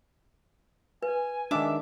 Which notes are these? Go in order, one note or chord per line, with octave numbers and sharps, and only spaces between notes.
B4 G#5
D#3 G#3 D4 E5 D6